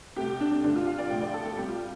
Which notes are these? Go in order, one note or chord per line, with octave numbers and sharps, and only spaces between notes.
C2 C3 A3 G4
D4
D4
G2 D3 A3 D4
F4
F5
D5
A2 F3 A3 G5
D5
A4
A4
C2 C3 G3 G4
F4